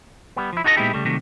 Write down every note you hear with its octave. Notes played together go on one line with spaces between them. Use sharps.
G3 B3
F3 E4
D#4 F#4 A4 A#4 D#5
A#2 G#3 B3 D#4 E4 G4
C#3 G3 A3
C3 D#3 F#3 G3 A3